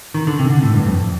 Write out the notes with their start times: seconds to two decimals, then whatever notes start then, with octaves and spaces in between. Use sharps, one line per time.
0.15 D#3
0.27 D3
0.39 C3
0.50 D3
0.63 A2
0.74 G2
0.86 F2